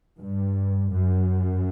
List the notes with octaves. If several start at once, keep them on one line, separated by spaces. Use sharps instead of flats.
G2
F#2